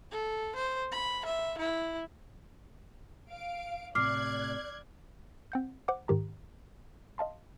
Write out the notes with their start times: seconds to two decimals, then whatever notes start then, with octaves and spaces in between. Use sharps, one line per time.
0.11 A4
0.55 C5
0.92 B5
1.25 E5
1.58 E4
3.30 F5 D7
3.95 A2 C3 D5 D6 F6 F#6 G#6 C7
5.52 C4 F#5 G6
5.88 C5 F#5 D6
6.08 G#2 D#3 G4 A#5
7.18 D#5 F5 A5 C6